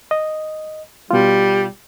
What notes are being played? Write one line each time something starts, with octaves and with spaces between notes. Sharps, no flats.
D#5
B2 G3 F4